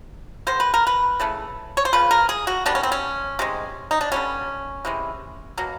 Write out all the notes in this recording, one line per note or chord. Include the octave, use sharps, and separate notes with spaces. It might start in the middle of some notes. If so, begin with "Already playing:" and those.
D#3 G#3 B3 C5
B4
A#4
B4
C#3 E3 A3
C#5
C5
C#3 F3 B4
A#4
G#4
F#4
D#3 G3 B3 D4
C#4
C4
C#4
C3 D#3 G#3
D#4
D4
D3 G3 B3 C#4
C3 E3 G#3
B2 F#3 A#3